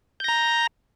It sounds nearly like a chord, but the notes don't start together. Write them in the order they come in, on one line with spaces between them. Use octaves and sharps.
G6 A#6 A#5